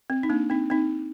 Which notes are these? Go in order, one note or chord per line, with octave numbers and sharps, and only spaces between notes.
C4
D#4
A#3 D4
C4 D#4
C4 D#4